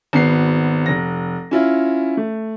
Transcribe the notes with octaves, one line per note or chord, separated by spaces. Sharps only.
G#1 B3 C7
F1 A#6
C#4 E4 F4
A3